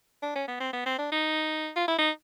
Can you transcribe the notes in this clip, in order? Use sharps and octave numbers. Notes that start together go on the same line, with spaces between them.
D4
C#4
B3
C4
B3
C4
D4
D#4
F4
E4
D#4